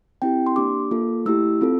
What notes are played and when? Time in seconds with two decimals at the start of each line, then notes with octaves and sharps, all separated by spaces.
0.22 C4 E4 G4 G5
0.46 C6
0.56 A#3 D4 G4 D6
0.91 A#3 F4 A4
1.26 A3 E4 G4 E6
1.61 C4 F4 A4